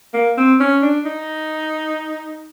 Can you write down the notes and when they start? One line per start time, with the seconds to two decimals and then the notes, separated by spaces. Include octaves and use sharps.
0.14 A#3
0.37 C4
0.60 C#4
0.82 D4
1.05 D#4